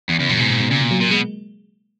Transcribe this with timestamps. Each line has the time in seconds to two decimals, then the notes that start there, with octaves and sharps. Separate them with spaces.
0.09 E2 E3
0.20 E2 C#3
0.29 F#2 A#2
0.40 G#2 B2
0.50 A#2
0.60 B2
0.70 A#2 C#3
0.81 B2
0.91 F#3
1.00 A#2 A#3
1.11 B2 G#3